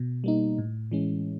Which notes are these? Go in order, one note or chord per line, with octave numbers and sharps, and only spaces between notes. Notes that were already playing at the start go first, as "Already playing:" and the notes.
Already playing: B2
G3 A#3 D#4
A2
E3 G#3 C#4